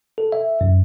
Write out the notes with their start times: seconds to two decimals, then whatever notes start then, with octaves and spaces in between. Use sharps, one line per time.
0.18 A4
0.32 E5
0.61 F#2